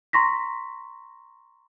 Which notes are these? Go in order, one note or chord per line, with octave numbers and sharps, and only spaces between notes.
A#5 C6 C#6 A#6 B6